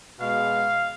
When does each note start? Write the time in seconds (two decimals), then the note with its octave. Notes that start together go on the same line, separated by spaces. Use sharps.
0.19 B2 G#3 F5